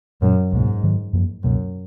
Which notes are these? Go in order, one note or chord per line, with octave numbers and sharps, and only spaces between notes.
F#2 A#2 G#3 C#4
C#2 G#2 B2 A#3
G#2 D#3 F#3
F#2 F3 A#3
C#2 F#2 B2 A#3